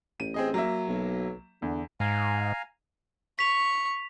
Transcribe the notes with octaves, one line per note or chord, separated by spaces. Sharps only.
A1 D#7
C4 G#4 D#5
F#3 A#3 E5
B1
E2 D3
G#2 F5 G#5 A#5
C#6 B6 F7